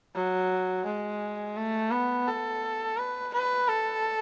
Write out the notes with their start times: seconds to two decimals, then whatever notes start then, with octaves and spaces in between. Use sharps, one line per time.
0.15 F#3
0.85 G#3
1.57 A3
1.91 B3
2.28 A4
2.97 B4
3.33 B4
3.69 A4